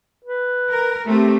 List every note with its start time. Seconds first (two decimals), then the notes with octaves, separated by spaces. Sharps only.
0.24 B4
0.71 A#4
1.07 A3 C4 G4